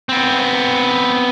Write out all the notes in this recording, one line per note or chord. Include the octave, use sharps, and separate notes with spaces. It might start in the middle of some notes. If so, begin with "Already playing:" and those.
B3 C4